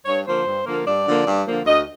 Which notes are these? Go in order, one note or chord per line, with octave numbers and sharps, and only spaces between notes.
G2 C#5
D3 F3 A#3 C5
G2
D3 F3 A#3
G2 D5
D3 F3 A#3
G2
D3 F3 A#3
D2 D#5